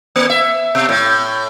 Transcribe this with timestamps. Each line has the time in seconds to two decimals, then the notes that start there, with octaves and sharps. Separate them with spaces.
0.16 A#3
0.30 E5
0.75 B2
0.89 A2